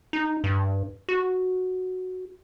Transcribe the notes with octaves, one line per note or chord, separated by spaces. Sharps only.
D#4
G2
F#4